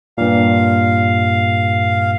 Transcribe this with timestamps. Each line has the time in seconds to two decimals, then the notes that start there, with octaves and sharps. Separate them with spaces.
0.18 G2 A#2 F5